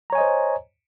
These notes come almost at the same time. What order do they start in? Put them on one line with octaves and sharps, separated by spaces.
A#5 C#5 G#5 D#5 C5